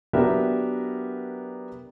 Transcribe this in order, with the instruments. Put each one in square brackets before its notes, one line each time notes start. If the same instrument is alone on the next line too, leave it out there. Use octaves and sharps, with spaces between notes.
[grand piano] F#3 B3 D4 G4 A#4 E5